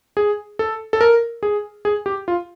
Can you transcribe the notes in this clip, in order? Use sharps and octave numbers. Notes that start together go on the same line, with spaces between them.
G#4
A4
A4
A#4
G#4
G#4
G4
F4